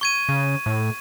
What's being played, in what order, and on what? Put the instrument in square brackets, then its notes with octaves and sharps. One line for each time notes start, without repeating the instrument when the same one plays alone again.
[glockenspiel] C#6 G#6 D#7
[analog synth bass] C#3
A2